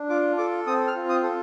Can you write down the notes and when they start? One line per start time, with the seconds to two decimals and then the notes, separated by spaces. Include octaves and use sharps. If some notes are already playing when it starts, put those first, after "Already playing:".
Already playing: D4
0.09 F4 D6
0.38 A4 D6
0.67 C4 D#6
0.87 F6
0.95 F4
1.09 D#6
1.23 A4